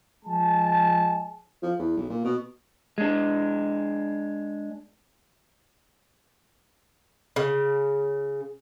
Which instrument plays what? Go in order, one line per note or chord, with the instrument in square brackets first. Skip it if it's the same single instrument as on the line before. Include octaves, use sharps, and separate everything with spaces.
[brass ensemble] F3 G#3 G#5 A5
[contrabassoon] F3
E2
B1
A#2
B2
[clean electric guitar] G#3 D4
[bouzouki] C#3